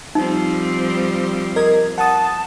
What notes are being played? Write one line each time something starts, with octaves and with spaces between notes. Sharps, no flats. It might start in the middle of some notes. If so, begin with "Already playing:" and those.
F3 G3 C4 D#4
A#4 D#5 G#6
F#5 A5 D#6